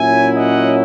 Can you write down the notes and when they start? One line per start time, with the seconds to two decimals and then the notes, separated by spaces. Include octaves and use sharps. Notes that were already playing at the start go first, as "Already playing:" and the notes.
Already playing: A#2 F#3 C#4 E4 E5 G#5
0.35 D#5 F#5